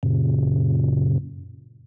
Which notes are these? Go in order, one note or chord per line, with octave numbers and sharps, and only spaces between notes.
F#2 A#2 C#3